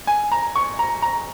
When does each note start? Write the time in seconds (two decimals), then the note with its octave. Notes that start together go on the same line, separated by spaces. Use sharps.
0.07 G#5
0.32 A#5
0.56 C#6
0.79 A#5
1.02 A#5